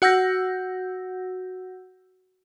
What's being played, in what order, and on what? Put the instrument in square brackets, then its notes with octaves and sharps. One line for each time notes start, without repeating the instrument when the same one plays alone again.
[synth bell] F#4 F#5 E6 G6 A#6